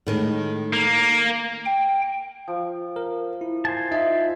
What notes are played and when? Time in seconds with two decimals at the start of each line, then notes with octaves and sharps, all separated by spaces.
0.07 A2 D#3 G#3
0.73 A#3
1.66 G5
2.48 F3
2.96 A#4
3.41 E4
3.65 C5 G#5 A5
3.91 D#4 F4 D#5 E5